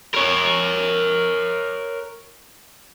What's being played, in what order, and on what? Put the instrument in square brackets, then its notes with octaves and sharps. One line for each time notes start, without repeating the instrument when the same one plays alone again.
[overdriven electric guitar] A#4 C#5